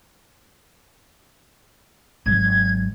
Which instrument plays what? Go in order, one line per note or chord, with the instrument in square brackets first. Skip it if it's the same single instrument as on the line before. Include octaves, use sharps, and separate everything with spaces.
[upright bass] G#1 F#3 [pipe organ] G#6